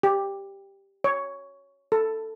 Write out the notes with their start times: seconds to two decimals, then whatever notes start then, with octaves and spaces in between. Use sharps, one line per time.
0.03 G4
1.04 C#5
1.92 A4